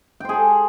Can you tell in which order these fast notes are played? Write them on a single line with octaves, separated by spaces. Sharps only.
G5 C5 G#4 A4